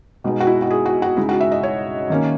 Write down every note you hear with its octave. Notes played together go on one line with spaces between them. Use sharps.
B2 G#3 B3 D#4
F#4
E4
F#4
G#4
F#4
F#4
C#3 G#3 D#4 E4
F#4
E5
D#5
C#5
D#3 A#3 C#4